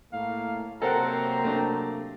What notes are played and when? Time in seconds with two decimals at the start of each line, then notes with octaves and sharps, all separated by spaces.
0.13 A2 A#3 F5
0.82 C3 F#3 A#3 C4 A4 A#4 F#5 A#5
1.44 A3 D4